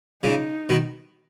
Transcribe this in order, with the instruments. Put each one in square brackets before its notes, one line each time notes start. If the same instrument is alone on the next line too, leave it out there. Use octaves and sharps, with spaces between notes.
[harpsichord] A#2 C#3 [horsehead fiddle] D#4
[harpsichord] B2 D#3